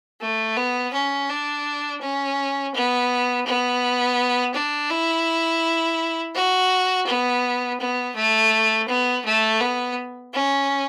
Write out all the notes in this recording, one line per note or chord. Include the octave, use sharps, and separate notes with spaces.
A3
B3
C#4
D4
C#4
B3
B3
D4
E4
F#4
B3
B3
A3
B3
A3
B3
C#4